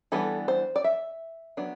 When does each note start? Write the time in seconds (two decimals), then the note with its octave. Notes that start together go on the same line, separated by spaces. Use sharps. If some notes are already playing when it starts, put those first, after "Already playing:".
0.12 E3 G3 B3 D4 A4
0.48 C5
0.76 D5
0.84 E5
1.57 F#3 B3 D4